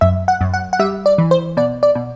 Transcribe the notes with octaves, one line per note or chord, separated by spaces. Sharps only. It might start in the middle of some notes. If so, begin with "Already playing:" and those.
F#2 E5
F#5
F#2
F#5
F#5
G3 E5
D5
E3
C5
B2 D5
D5
B2